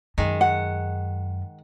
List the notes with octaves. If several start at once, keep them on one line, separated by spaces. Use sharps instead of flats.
F#2 D#3 G#3
F#5